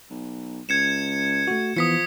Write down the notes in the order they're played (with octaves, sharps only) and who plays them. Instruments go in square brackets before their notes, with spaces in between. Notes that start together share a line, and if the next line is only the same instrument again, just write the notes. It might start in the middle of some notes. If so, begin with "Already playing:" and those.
[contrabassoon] B1
[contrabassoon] C#2 [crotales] G#6 C#7 E7
[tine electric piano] A3 F#4
[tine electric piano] E3 B3 [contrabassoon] F3 [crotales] D#6 B6 C#7